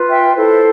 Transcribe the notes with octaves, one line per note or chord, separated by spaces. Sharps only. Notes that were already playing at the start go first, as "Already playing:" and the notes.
Already playing: F4 B4
E5 G5
E4 A4 C5